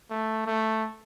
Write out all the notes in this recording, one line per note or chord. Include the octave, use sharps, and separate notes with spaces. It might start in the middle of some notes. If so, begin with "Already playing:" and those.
A3
A3